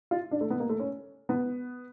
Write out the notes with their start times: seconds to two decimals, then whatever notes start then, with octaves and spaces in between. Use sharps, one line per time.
0.11 F4
0.31 D4
0.41 A3
0.50 B3
0.60 A#3
0.69 A3
0.79 C#4
1.29 B3